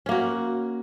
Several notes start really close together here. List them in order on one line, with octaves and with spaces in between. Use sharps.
C#4 A#3 F#4